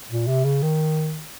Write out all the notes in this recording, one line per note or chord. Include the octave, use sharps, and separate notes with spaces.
A#2
C3
C#3
D#3